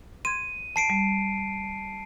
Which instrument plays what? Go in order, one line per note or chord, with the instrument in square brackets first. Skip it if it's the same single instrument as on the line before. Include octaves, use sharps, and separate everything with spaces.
[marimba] C6 G#6 [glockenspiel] D#7
[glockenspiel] A5 C7 D7
[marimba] G3